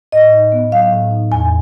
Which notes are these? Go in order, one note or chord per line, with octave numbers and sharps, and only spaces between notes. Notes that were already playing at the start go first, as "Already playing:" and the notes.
A2 D#5
D#4
B3
F#3 F5
A2
D#4
E2 G#5